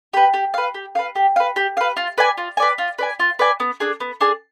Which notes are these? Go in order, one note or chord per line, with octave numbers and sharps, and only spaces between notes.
G4 B4
G4
B4 F5
G4
B4 F5
G4
B4 F5
G4
B4 F5
F4
B4 D5 G#5
F4
B4 D5 G#5
F4
B4 D5 G#5
F4
B4 D5 G#5
B3
D4 G#4
B3
D4 G#4